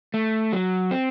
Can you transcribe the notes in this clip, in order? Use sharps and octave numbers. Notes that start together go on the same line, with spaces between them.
A3
F#3
C4